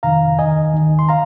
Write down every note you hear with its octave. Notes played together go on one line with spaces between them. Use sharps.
F2 C3 D#3 F5 A#5
D#2 D#3 D#5 G#5
D#2 D#3
C6
F5 A#5